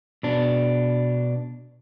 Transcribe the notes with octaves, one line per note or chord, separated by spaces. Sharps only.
B2 D4